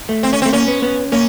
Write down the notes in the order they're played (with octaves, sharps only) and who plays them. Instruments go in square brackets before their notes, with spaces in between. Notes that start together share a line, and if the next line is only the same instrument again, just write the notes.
[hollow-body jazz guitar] A3
[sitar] C4
C#4
C4
[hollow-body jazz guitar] A3
[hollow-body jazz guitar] A#3 [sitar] C#4
[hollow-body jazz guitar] B3
B3
[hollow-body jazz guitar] A#3 [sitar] C#4